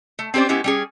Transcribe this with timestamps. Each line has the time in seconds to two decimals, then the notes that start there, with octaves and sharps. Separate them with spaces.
0.19 A3
0.34 C4 C#4 G4 C5 D5
0.49 G#3 B3 C#4 E4 G4
0.64 G3 C#4 G#4